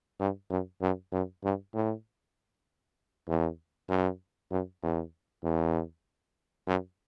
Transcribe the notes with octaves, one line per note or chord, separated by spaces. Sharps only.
G2
F#2
F#2
F#2
G2
A2
E2
F#2
F#2
E2
E2
F#2